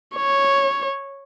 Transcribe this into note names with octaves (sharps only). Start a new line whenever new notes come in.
C#5